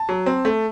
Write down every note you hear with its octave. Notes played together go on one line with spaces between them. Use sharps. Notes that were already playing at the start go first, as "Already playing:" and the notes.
Already playing: A5
F#3
C4
A3